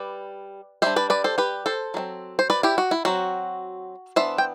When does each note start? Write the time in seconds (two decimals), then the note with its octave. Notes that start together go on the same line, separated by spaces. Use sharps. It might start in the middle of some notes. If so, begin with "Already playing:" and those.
Already playing: G3 B4 D5
0.82 G3 D4 C5 E5
0.96 B4 D5
1.10 B4 D5
1.24 A4 C5
1.38 G4 B4
1.66 A4 C5
1.94 F#3 A3 C4
2.39 C5
2.50 B4 D5
2.63 E4 G4
2.78 F#4
2.91 E4
3.05 F#3 C4 F#4
4.16 E3 B3 D4 C5 E5
4.38 G5